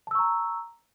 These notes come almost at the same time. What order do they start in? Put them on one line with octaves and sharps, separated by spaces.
A5 E6 C#6 A#5